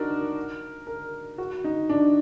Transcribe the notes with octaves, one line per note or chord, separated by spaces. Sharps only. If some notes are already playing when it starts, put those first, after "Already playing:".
Already playing: D4 D#4 F#4 A#4
A#4
F#4
D#4
D4